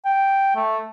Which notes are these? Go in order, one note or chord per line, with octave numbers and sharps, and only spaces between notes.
G5
A3